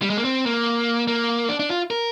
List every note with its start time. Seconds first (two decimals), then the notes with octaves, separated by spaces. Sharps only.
0.02 G3
0.10 G#3
0.17 A#3
0.25 C4
0.46 A#3
1.07 A#3
1.49 D4
1.60 D4
1.70 F4
1.90 A#4